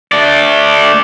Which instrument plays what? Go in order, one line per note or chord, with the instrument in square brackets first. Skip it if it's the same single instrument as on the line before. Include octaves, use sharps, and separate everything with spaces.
[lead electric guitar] A3 D5